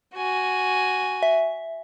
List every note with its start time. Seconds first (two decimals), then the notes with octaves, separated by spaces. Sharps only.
0.15 F#4 G#5
1.23 E5